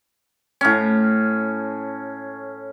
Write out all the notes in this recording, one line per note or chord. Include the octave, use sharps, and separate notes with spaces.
A2 C#4